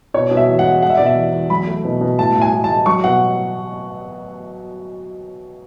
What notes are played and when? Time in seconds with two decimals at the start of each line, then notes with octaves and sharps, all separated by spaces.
0.14 B2 C#5
0.31 B2
0.37 E5
0.49 E2
0.59 F#5
0.66 G#3
0.82 G#3 F#5
0.90 E5
0.97 B2 D5
1.06 E5
1.16 E2
1.33 E2
1.50 F#3 B5
1.67 A3
1.85 B2
2.01 B2
2.19 A2 A5
2.35 A2
2.41 G#5
2.52 A2
2.64 A5
2.69 G#3
2.86 F#3 C#6
3.04 B2 F#5